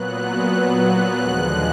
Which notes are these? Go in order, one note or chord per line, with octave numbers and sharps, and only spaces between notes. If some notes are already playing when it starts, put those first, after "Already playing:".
Already playing: A#2 F#3 B3 F#6
D#2 D3 F3 G#3 F#6